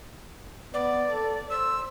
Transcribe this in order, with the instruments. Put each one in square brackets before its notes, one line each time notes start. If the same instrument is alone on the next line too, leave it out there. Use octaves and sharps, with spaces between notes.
[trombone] B3 [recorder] D5
[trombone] A4
[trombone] C5 [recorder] E6